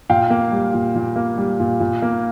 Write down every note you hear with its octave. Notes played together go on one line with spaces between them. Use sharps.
A#2 F5 G5
A#3
G3
A#2
A#2
A#3
G3
A#2
A#2
A#3